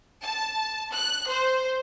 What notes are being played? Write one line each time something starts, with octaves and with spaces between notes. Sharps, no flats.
A5
F#6
C5